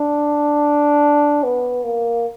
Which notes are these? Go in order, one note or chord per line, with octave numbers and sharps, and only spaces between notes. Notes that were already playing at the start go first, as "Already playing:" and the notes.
Already playing: D4
B3
A#3